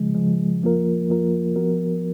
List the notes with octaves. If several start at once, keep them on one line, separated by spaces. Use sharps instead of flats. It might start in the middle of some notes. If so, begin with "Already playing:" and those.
Already playing: C#3 F3 G#3
C#3 F3 G#3
F2 F3 A#3 F4 A#4
F2 F3 A#3 F4 A#4
F3 B3 F#4 A#4